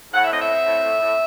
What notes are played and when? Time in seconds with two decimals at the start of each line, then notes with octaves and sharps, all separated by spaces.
0.14 A2 F#5
0.23 E5
0.31 C4 D#5
0.41 E5
0.48 C4
0.66 A2
0.83 A2
1.01 A2